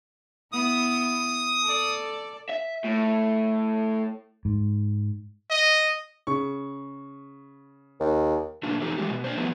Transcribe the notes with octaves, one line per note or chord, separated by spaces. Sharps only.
B3 E4 D#6
A4 D5
E5
A2
G#2
D#5
C#3 C#6
D#2
A#2 C#3 A3 A#3 D4 F#4
F2 E3 D#4 G4 A4
E3 G#3 G4
B2
D4 C5
F3 A3 B3 E4 G4 B4